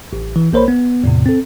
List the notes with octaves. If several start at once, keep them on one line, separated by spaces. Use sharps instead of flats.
A1
E3
A#1 A#3 A#4 C5 C#5 B5
B3
E2 A2 C3
C4 A4